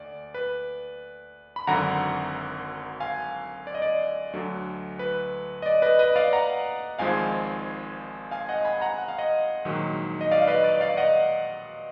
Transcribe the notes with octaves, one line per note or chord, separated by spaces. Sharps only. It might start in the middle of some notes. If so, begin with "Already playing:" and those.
Already playing: D2 D5
B4
B5
G#1 F#2 D3 F#5 A#5
F5 G#5
D5
D#5
D5
D2 D3 F#3
B4
D#5
D5
B4 D#5
B4 D#5
D5 F5
F#5 A#5
G#1 G#2 F3 G#3 F5 G#5
F5 G#5
D#5 F#5
G#5 B5
F#5 A#5
F#5
F5
D#5 F#5
A#1 G#2 D#3 F#3
D#5
D5 F5
F5
B4 D#5
D5
D5 F5
D#5 F#5